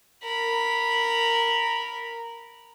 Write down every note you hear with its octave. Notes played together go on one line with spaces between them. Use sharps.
A#4 B5